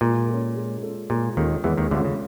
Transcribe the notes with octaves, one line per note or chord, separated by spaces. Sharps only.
A#2 G#3
C#4 F4 A4
G#3
C#4 F4 A4
A#2 G#3
D#2 D#3 C#4 F4 A4
E2 E3 G#3
D#2 D#3
D2 D3 C#4 F4 A4
C#3